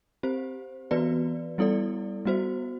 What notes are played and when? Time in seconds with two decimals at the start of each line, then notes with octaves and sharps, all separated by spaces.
0.23 C4 G4 C5
0.91 E3 B3 F#4 B4 D5
1.58 G3 B3 E4 A4 D5
2.25 G3 B3 F#4 C5